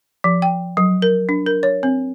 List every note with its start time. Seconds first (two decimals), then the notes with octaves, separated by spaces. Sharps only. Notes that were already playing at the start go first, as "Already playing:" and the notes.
0.24 F3
0.42 G5
0.77 F#3
1.02 A#4
1.29 D4
1.47 A#4
1.63 C#5
1.83 C4